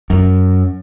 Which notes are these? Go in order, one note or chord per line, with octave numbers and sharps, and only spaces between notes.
F#2